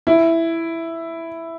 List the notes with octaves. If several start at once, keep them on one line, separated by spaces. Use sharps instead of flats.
E4